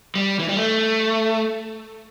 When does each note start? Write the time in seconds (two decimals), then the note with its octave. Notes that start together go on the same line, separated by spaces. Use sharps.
0.15 G3
0.39 E3
0.49 G3
0.56 A3